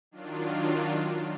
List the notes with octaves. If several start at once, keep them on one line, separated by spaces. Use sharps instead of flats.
D#3 F#3 D4 F4